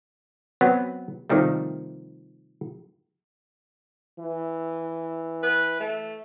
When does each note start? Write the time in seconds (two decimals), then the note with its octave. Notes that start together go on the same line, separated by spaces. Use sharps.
0.61 F#3 B3 C4
1.30 C3 D#3 F3 G3 A3
4.19 E3
5.43 B4
5.80 A3